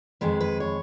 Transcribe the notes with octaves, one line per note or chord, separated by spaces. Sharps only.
F2 D#3 G#3 B4
B4
C#5